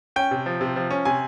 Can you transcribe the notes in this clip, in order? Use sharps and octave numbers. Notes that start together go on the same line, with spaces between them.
C#4 G5
C3
F3
C3
F3
C#4
C3 G#5